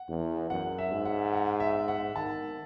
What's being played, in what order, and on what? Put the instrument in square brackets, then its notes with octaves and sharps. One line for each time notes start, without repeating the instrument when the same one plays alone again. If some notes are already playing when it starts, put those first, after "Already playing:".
Already playing: [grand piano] F#5
[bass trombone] E2
[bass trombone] F#2 [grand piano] F#5
[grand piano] E5
[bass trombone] G#2
[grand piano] F#5
F#5
E5
F#5
[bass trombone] D#3 [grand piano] A5